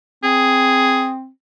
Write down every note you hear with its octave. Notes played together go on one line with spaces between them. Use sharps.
C4 G#4